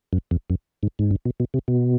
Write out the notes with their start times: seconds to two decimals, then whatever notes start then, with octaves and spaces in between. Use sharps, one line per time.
0.13 F#2
0.31 F2
0.50 F#2
0.83 G#2
0.99 G#2
1.11 G2
1.25 B2
1.40 B2
1.54 C3
1.68 B2